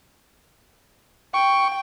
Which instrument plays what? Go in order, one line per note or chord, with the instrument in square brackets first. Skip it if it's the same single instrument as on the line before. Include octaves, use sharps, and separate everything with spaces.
[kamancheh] G5 [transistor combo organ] C#6